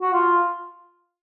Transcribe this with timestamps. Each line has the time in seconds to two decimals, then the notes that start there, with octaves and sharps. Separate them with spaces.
0.02 F#4
0.13 F4